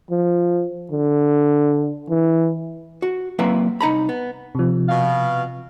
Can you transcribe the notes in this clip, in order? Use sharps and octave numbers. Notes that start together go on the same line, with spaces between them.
F3
D3
E3
F#4
F#3 A#3 C4 E4 B4 E5
C2 D#4 A#5 B5
B3
C3 F3
B2 F5